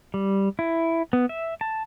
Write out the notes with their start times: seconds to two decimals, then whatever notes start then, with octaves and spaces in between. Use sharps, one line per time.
0.14 G3
0.59 E4
1.13 B3
1.29 E5
1.61 A5